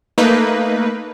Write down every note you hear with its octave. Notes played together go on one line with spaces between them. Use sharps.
A3 A#3 D#4 B4